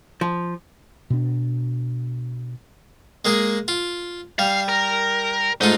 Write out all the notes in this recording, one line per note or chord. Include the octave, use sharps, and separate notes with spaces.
F3
B2 D4
G#3 A#3 G#4
F4
G3 F5
A#4
G#2 A3 D#4 F4